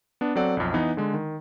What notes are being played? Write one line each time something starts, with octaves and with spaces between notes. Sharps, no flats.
B3 D4
F#3 C4 A4 D5 F#5
B1 F2
E3 B3 D#4
D3 G#3
D#3